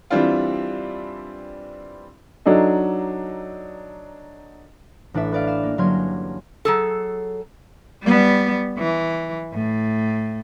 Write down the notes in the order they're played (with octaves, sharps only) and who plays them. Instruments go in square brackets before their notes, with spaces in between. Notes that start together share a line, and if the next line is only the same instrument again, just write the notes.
[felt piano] E3 G3 C4 D4 E4 F4
[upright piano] F#3 D4 D#4 A4 D#5
[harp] A1 D4 B4 E5
B4 D5 F5
F5 E7
A#3
G1 F#3 A#3 C#4 C6 G#6
[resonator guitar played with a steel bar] F#3 G#4 A4
[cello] G3 B3
E3
A2